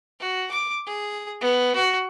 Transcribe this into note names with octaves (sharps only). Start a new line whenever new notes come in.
F#4
D6
G#4
B3
F#4